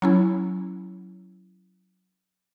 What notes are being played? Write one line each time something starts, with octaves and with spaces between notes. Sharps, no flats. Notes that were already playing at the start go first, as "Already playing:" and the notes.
F#3 C#4 E4